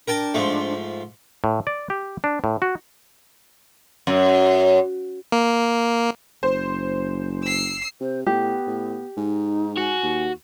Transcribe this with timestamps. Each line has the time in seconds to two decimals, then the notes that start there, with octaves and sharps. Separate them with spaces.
0.08 D4 A#4 G5 A5
0.34 G#2 F3 A3
1.44 A2
1.67 D5
1.90 G4
2.24 D4
2.44 A2
2.62 F#4
4.07 F#2
5.32 A#3
6.43 F#1 C5
7.43 E6 C7
8.01 C3 C5
8.26 A2 B3 G4
8.67 A2
9.17 G#2 D#4
9.78 F#4 G#5
10.03 D#2